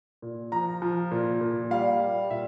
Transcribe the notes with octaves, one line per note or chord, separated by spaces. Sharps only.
A#2
F3 A#5
F3
A#2
A#2
G3 F5
G3
A#2 E5